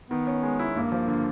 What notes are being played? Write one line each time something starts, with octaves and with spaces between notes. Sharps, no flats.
D#3 B3
C#4
G#3
E4
G2 A#3
F3
D3